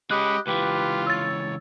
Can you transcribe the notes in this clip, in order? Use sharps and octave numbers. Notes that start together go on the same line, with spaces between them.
G#3 C#4 G4 D#5 G5 B5 F#6
C#2 E3 F4 G4 B4
C#5 E6 A6